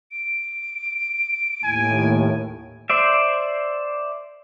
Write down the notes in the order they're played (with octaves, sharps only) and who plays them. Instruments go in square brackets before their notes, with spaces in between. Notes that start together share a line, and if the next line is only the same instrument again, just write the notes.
[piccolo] D7
[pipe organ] D#2 A2 [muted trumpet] G#5
[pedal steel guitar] C5 D5 E5